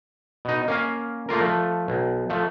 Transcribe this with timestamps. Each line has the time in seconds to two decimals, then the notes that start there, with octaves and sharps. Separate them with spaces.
0.45 B2 D#4
0.68 A#3 C#4 F5
1.29 A3 A#3 F4 A#4
1.40 F3 A3
1.88 B1
2.30 F3 A3